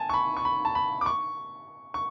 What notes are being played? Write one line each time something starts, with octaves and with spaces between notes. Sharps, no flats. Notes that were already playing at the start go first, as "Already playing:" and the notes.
Already playing: G#5 A5
C#6
B5
C#6
B5
A5
B5
D6
C#6
C#6